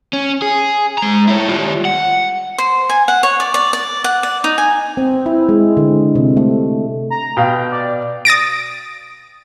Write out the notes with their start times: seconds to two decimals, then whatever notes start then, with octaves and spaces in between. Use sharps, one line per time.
0.13 C#4
0.42 G#4
0.98 G#3 A#5
1.28 E4 C#5
1.48 G3 F4
1.85 F#5
2.58 C5
2.89 G#5
3.08 F#5
3.23 C#5
3.40 D5
3.54 D5
3.73 D5
4.04 F#5
4.23 D5
4.44 D#4
4.58 G#5
4.97 C4
5.26 E4
5.49 G#3
5.77 D3
6.15 C3
6.37 A3
7.10 A#5
7.37 B2 F5 G5
7.72 D5
8.25 D#6 A6 A#6 D7